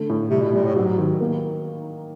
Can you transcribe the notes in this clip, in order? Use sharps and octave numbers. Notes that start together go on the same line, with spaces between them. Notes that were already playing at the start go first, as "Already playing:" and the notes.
Already playing: D3 A3
A2
C3 G3
B2
A#2 G3
A2
G#2 F#3
D#3
A#3